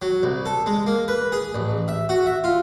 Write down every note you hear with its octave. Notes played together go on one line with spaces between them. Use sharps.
F#3
C2
A4
G#3
A#3
B4
G#4
A1
E5
F#4
E5
F4